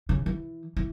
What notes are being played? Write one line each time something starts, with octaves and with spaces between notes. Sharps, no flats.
C#3
E3
E3